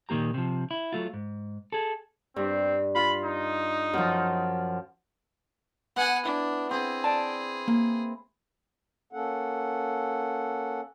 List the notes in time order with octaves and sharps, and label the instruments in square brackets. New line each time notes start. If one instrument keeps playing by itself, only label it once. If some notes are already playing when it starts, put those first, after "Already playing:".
[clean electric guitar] A#2 D#3 A#3 G4 A#5
C3 F3
E4
F#3 A3 F4
G#2
G#4 A4
[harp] G2 [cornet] C4
[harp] F4 [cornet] B5
[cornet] D#4
[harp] F#2 F3
[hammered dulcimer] B3 [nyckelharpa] F#5 G#5
[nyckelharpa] D4 [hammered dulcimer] E4
[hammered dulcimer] C4 [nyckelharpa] G#4
[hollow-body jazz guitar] D5 A5
A#3
[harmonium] A#3 C#4 A4 F#5